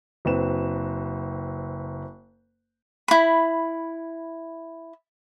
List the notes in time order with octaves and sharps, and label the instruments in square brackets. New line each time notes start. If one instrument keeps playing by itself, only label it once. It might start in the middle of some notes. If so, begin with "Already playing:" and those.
[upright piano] F#1 C4 B4 E7
[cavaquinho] E4 B5